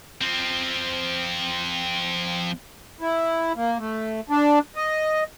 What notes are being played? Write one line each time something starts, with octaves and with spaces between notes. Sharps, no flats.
F3 C4
E4
A#3
A3
D4
D#5